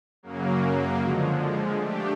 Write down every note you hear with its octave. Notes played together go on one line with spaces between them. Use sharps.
F#2 C#3 F#3 A#3
D3 F3 G#3
A3 D4 G4